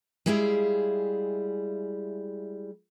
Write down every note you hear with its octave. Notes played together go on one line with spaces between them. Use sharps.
G3 G#3 E4 G#4 E5 F5